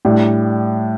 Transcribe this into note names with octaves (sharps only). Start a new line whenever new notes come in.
A2 G3 D4